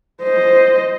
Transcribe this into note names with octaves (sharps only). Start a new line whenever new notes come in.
C5 D#5